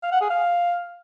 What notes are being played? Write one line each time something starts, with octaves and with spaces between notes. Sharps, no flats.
F5
F#5
G#4
F5